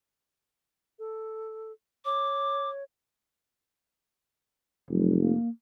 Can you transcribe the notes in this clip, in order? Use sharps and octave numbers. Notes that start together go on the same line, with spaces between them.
A4
C#5 D6
F1 F#3
A#3